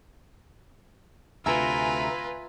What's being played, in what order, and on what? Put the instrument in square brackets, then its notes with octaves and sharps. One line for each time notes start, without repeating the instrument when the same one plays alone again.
[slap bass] D2 C3 [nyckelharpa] F4 [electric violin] B4 [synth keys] E5 G#5 A#5